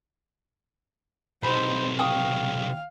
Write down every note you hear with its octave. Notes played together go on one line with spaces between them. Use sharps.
B1 C3 D#4 C5 B5
F5 G5 C#6 D#6